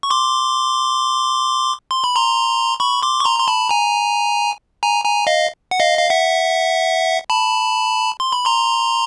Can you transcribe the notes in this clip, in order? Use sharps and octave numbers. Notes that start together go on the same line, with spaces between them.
C#6
C6 D6
C6
B5
A#5 C6
B5 C#6
C6 D6
C#6
A#5 C6
C6
A5 B5
G#5 A#5
G#5 A#5
G#5 A#5
D#5 F5
F#5
D#5 F5
F5
E5 F#5
A5 B5
C6
B5
A#5 C6